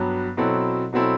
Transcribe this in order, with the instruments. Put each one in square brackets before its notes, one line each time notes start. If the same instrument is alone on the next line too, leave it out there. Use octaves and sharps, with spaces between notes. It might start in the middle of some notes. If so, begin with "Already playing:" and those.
Already playing: [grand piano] G2 F#3 B3
B2 F#3 C4 E4 A4
B2 F#3 C4 E4 A4